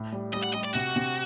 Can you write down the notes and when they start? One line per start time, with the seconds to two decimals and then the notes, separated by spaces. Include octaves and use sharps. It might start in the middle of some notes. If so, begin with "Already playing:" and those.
Already playing: A2
0.12 G3
0.34 G3 D#5
0.44 F#5
0.54 G3 D#5
0.65 D5
0.75 C3 F#4
0.96 C3